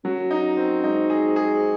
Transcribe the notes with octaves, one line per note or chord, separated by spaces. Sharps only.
F#2 F#3
D#4
C4
G#2 D#4
G#4
G#4